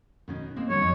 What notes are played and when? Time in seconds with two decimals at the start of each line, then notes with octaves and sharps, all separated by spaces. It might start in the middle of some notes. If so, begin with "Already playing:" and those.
0.28 B2 D#3 C#4
0.56 G#3 A#3 C4
0.70 D3 D#3 G3 C#5
0.81 F2 D#4